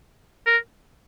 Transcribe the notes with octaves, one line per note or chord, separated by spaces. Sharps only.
A#4